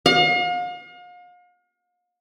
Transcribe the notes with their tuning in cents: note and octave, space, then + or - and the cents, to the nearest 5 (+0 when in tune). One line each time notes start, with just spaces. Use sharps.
F5 +40